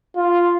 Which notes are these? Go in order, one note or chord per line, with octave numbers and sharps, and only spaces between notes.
F4